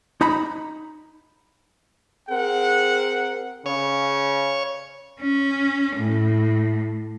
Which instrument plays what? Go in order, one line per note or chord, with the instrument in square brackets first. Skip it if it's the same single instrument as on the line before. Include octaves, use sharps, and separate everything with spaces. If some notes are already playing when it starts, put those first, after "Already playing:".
[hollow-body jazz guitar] D#4 A#5 B5
[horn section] C4 G#4 A#4 F#5
[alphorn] C#3 [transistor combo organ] C#5
[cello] C#4
A2